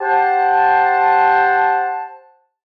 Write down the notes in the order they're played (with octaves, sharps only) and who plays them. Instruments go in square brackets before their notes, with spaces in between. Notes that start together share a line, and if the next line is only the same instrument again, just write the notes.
[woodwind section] G4 C5 F#5 A5